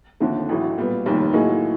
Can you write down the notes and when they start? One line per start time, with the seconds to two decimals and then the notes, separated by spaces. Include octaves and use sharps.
0.20 D#2 D3 F3 A3 C4
0.49 A1 A2 F#3 A3
0.78 A#2 G3 B3
1.06 F1 D#2 D#3 G3
1.33 A2 F#3 A#3 D#4 G#4